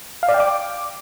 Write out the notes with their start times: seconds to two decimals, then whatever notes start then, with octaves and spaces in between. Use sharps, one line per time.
0.23 F5
0.28 D5
0.34 G5
0.40 D6